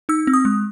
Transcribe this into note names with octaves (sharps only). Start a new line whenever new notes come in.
D#4 E6
C4
D#6
G#3